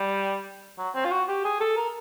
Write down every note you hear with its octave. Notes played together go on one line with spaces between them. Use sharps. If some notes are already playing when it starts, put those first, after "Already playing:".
Already playing: G3
F#3
C4
F4
F#4
G4
G#4
A4
A#4